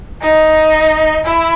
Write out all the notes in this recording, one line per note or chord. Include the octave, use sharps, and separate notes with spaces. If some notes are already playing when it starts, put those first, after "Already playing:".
D#4
E4